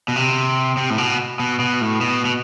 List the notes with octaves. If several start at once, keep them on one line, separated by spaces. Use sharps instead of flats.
B2
C3
C3
A2
B2
B2
B2
A2
B2
B2